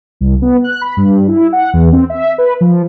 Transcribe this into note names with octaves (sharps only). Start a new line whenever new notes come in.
C2
B3
F#6
B5
G2
E4
F#5
E2
C4
E5
B4
F3